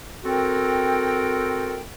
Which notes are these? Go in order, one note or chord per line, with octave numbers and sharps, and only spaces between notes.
C4 F#4 A4 A#4 G5